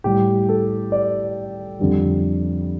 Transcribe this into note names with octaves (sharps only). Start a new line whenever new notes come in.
A2 G3 G4
A4
D5
F2 D3 G3